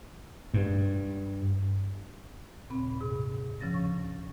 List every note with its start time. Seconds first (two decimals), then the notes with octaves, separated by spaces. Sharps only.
0.54 G2
2.70 D#2 A#2 C#3 C4 B5
3.00 G#2 C3 G#4
3.61 D2 C#3 F3 C#4 A6 A#6
3.74 C#6